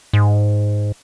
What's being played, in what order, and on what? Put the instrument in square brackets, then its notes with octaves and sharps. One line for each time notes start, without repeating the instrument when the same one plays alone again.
[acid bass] G#2